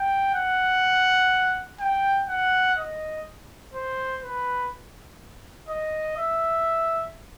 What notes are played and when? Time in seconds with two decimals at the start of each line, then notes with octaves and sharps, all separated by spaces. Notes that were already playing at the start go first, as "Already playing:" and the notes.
Already playing: G5
0.34 F#5
1.80 G5
2.29 F#5
2.78 D#5
3.74 C5
4.23 B4
5.69 D#5
6.17 E5